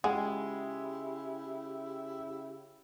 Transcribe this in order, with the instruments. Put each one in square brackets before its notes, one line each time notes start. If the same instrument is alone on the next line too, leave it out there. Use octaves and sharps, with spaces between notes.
[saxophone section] C#3 E4 G4 [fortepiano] G#3 [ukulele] F4 F#5 G5 [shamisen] G#4